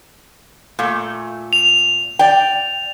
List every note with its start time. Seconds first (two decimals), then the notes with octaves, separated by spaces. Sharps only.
0.79 A#2 A3
1.53 F7
2.19 D5 G5